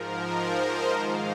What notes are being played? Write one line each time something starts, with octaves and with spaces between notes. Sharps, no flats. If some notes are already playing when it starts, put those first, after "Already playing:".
Already playing: G#2 F3 A#4
C5
D#5
G#2 D#3 F5